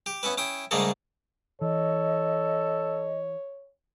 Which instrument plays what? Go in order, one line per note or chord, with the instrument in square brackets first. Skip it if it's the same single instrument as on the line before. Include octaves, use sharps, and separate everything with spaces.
[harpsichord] G4
B3 C#4 E4 B4
C#4 E4 G5 D#6
G#2 C#3 G3 A3 A#3 G#4
[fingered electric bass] E3 [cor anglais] A4 [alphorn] C#5 [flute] D#5